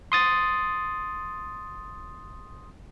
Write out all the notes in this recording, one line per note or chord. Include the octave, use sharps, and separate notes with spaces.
C6 D#6 A6